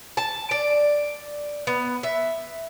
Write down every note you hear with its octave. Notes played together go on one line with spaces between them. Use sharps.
A5
D5
B3
E5